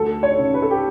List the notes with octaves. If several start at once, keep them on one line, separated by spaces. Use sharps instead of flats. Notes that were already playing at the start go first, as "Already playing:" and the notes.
Already playing: D2 A4
C#5
C#3
B4
A4
G4